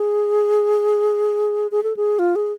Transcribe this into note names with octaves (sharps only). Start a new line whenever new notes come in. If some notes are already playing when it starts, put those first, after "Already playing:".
Already playing: G#4
G#4
A4
G#4
F4
G#4